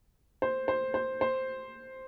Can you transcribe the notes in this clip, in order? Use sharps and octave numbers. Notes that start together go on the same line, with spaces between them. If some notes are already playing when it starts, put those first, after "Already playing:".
C5
C5
C5
C5